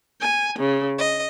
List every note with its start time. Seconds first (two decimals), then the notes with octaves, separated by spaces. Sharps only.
0.22 G#5
0.58 C#3
0.98 D#5